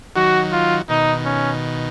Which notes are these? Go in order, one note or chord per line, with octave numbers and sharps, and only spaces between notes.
D#3 F#3 F#4
F4
B2 D#3 D#4
C#4